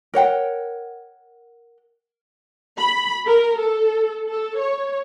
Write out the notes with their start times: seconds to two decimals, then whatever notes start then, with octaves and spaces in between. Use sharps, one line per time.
0.14 A#4 C#5 F#5 G5
2.79 B5
3.26 A#4
3.58 A4
4.29 A4
4.59 C#5